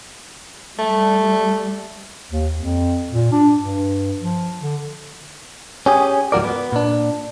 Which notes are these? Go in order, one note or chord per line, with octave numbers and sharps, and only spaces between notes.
G3 A3
D#2
F2
A#2
D4
G2
F3
D3
C#4 G4 G#4
C#2 G#2 F3 F#4 A#4 D5
B3
A#2 D4